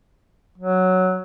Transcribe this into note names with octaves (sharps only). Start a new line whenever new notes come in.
F#3